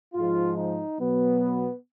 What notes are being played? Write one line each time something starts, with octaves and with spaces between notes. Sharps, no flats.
G#2 F3 G#3 F4
D#4
B2 F#3 B3